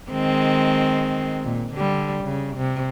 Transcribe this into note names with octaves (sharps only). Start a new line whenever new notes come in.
D#3 G#3 C4
A#2
D3 G3
C#3
C3